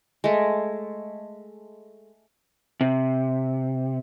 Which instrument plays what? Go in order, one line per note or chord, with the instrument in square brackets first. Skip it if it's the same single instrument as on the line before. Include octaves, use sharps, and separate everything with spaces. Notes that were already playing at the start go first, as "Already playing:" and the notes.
[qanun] G#3 A3
[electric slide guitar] C3